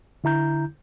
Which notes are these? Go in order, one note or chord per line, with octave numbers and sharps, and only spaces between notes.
D3 E4 A#5 G6